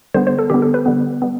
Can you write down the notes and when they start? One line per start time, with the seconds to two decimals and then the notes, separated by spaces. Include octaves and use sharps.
0.14 D3 G3 B3 C5
0.27 C5
0.39 A4
0.50 D3 G3 B3 G4
0.62 A4
0.74 B4
0.86 D3 G3 B3
1.22 G3 B3